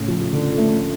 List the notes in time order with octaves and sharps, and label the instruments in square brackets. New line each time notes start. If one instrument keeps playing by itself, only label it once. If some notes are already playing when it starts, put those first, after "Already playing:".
Already playing: [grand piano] A2 C#3
[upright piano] F3
D3
A3